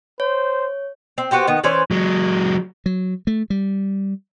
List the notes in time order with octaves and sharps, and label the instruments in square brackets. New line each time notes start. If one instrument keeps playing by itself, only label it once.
[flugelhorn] C5 [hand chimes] C#5
[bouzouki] C4
B3 F#4 G4 C5
D#3 B3
E3 C#4 C5 D5
[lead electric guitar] F#3 G#3
[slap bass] F#3
A3
G3